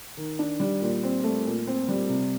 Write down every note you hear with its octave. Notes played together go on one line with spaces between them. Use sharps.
D#3
D4
G3
A#2
C4
A3
A#2
C4
G3
C3